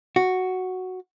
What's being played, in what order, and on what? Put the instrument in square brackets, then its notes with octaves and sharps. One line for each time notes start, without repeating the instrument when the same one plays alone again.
[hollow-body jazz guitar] F#4